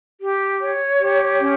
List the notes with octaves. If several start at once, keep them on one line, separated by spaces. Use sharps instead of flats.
G4
C#5
G4
C#4